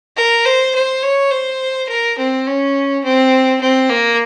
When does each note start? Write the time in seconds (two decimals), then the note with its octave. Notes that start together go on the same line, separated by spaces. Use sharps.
0.17 A#4
0.46 C5
0.75 C5
1.03 C#5
1.31 C5
1.89 A#4
2.18 C4
2.47 C#4
3.04 C4
3.61 C4
3.90 A#3